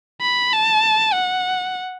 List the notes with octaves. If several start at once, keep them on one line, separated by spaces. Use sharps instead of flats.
B5
A5
F#5